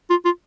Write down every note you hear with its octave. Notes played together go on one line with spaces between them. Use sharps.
F4
F4